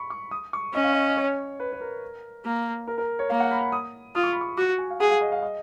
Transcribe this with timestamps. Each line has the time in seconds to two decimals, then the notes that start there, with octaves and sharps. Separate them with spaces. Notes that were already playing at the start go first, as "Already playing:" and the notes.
Already playing: B5 C#6
0.10 C#6
0.31 D#6
0.53 C#6
0.74 C#4 D#5
0.84 F5
0.93 D#5
1.09 D#5
1.17 C#5
1.60 B4
1.72 B4
1.81 A#4
2.45 A#3
2.88 A#4
2.98 A#4
3.19 C#5
3.30 A#3 F5
3.40 F#5
3.51 B5
3.61 B5
3.72 D#6
4.15 F4 D#6
4.23 C#6
4.33 B5
4.41 C#6
4.57 F#4 C#6
4.78 G#5
4.90 F5
5.00 G#4 F#5
5.10 F5
5.21 D#5
5.32 F5
5.42 D#5